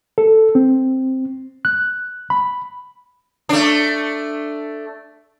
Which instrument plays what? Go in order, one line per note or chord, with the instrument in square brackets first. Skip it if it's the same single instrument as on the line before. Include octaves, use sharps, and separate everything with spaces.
[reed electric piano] A4
C4
F#6
B5
[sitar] A3 D4